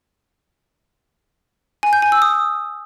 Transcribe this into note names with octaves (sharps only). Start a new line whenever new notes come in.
G#5
G6
G#5
E6
D#6